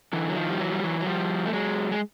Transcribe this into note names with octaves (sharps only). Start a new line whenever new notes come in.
D3 E3
F#3
D#3 F3
G3
E3 F#3
G3
E3 F#3
F#3
F3 G3
A3
F#3 G#3
G#3